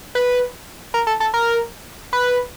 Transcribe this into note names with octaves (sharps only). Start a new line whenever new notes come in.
B4
A#4
A4
A4
A#4
B4